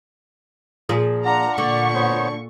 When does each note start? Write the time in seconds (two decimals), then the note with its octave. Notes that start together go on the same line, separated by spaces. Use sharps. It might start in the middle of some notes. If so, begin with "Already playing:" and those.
0.89 A#2 F3 G#4
1.25 D4 F4 F#5 A#5
1.58 A#2 D3 D5 C#6
1.95 B3 C5 C#5